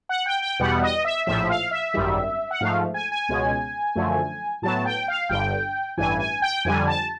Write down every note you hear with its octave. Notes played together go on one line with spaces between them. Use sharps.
F#5
G5
G5
E2 B2 G3 B3 F#5
D#5
E5
A#1 A2 F3 E5
F5
E5
G#1 F#2 D#3 G3
F#5
G#2 F3 A3 F5
G#5
G#5
C#2 B2 G#3 C#4
F#2 D3 F3 A3
A2 F#3 B3 A5
G5
F5
G1 G2 D3 G5
A1 G2 E3 G#5
G#5
G5
F2 D3 G3 G#5
A5